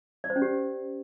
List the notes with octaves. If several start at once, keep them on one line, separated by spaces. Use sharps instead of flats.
D5
C5
C#4
G4